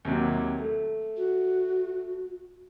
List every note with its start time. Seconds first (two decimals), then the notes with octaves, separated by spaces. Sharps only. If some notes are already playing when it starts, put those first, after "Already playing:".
0.05 D#2 C3 F#3
0.58 A3
1.17 F#4